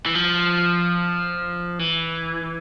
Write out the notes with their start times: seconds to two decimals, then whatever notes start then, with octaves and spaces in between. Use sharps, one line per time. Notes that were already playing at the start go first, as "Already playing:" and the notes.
0.06 E3
0.15 F3
1.79 E3